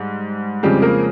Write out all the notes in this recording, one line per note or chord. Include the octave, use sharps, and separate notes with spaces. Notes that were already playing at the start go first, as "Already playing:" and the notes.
Already playing: G#2 G3
F2 C#3 F3 G3 G#3 G4
A#3 A#4